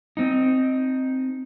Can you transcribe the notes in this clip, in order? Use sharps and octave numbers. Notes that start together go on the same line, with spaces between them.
C4 D#4